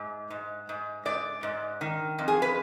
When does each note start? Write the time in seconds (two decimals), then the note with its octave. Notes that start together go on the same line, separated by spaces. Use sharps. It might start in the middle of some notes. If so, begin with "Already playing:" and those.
Already playing: G#2
0.30 G#2
0.69 G#2
1.05 G#2 D5
1.43 G#2
1.81 D#3
2.18 F2
2.28 G#4
2.42 B4